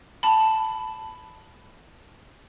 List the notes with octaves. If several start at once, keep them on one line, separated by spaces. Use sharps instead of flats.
A5 B5